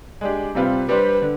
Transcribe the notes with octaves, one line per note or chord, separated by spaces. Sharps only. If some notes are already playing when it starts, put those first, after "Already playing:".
G#3 D4 G4
C3 G3 C4 F4 B4
G3 D4 G4 B4 C5
D3